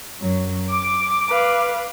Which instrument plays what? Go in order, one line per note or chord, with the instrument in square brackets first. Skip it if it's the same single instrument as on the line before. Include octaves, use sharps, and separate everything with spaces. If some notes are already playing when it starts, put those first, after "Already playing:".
[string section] F#2 F#3
D6
[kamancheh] B4 F5